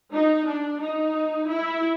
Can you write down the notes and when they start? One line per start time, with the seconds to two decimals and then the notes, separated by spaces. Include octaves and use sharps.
0.13 D#4
0.47 D4
0.80 D#4
1.48 E4